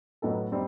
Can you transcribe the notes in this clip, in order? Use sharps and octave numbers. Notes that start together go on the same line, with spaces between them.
A2 F#3 B3 D#4 A4
G3 C4 D#4